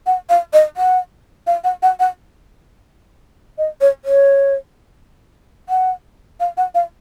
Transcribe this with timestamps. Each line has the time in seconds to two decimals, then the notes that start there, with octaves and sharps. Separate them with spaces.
0.07 F#5
0.29 F5
0.53 D#5
0.77 F#5
1.47 F5
1.64 F#5
1.83 F#5
2.00 F#5
3.58 D#5
3.81 C#5
4.05 C#5
5.69 F#5
6.40 F5
6.57 F#5
6.75 F5